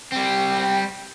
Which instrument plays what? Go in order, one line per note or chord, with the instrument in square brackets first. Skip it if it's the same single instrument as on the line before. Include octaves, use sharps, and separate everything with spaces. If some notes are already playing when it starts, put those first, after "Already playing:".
[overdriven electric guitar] G3 C4